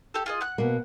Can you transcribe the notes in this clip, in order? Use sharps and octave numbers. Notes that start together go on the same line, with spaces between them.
G4 A4
F4 G#4 D#5
F#5 F#6
B2 A#3